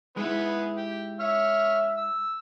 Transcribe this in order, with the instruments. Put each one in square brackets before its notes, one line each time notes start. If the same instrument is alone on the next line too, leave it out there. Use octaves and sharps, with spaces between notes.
[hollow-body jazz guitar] G#3 D#4 E4 [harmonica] B3 G#4 B4
[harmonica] G4 G5
[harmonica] C#5 F6 [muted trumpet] E5
[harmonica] E6